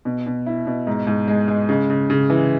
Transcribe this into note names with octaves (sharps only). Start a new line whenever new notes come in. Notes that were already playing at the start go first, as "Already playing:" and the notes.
B2
B2
E4
B2
G#2
G#2
G#3
G#3
C#3
C#3
C#3
E3